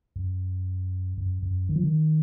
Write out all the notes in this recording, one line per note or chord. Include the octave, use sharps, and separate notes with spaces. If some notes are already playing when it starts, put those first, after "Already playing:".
F#2
F#2
F#2
D#3
F3
D#3